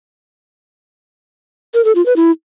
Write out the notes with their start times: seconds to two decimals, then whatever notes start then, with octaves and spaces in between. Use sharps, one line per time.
1.74 A#4
1.85 A4
1.95 F4
2.06 B4
2.16 E4